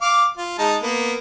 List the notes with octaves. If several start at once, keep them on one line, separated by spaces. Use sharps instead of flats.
F5 D6
F4
G#3 D#4 A5
A#3 B3